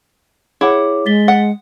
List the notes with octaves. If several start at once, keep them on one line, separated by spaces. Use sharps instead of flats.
E4 G#4 C#5 F#5 D6
G#3 A6 B6 G7
F#5